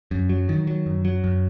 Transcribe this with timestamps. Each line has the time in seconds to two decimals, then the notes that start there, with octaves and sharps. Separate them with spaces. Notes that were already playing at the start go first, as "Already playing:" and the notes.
0.11 F#2
0.29 F#3
0.49 D#3
0.67 F#3
0.86 F#2
1.05 F#3
1.24 F#2